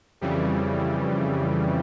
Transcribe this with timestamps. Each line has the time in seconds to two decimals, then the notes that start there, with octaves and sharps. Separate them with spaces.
0.21 F2 C#3 E3 G3